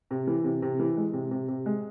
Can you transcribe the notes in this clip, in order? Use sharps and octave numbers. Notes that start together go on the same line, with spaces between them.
C3
E3
C3
C3
E3
G#3
C3
C3
C3
G#3